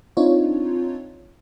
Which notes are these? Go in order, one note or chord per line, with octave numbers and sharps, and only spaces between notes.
C4 D4 D#4 F4 C#5